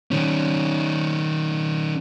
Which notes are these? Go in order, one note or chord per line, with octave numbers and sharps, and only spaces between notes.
D#3 C#4